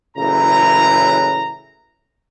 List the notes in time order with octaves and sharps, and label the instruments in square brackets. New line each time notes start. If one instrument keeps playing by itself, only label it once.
[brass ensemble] F#1 A2 C#3 E3 A#5